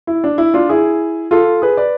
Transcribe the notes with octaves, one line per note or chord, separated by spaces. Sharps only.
E4
D4
E4
D4 F4
E4 G#4
F4 A4
G#4 B4
B4 D5